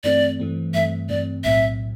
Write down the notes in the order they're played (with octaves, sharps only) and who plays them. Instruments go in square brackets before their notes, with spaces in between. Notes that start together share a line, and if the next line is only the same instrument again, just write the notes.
[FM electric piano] G2 E3 A3 C4 [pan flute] D5
[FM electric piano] G2 E3 A3 C4
[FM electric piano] G2 E3 A3 C4 [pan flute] E5
[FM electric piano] G2 E3 A3 C4 [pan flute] D5
[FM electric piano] B1 A2 F#3 C4 [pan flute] E5